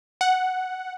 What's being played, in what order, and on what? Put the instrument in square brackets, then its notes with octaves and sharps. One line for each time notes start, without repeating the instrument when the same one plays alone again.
[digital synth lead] F#5